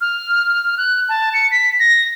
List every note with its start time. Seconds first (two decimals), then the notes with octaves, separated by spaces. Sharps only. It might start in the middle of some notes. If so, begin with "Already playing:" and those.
0.01 F6
0.78 F#6
1.09 A5
1.34 C#7
1.51 B6
1.80 A#6